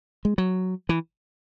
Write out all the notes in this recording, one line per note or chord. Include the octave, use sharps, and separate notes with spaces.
G#3
F#3
E3